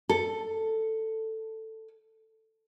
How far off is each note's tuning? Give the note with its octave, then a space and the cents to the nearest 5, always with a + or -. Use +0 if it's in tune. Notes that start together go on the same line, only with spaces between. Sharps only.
A4 +10